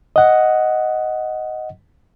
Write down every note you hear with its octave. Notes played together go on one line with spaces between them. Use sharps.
D#5 F#5